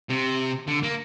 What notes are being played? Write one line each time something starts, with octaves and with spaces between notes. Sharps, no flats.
C3
D3
A#3